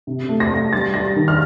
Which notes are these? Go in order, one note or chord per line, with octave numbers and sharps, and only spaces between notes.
C3
A3
A#6
A3
G3 A6
G3 A#6
D#3
F6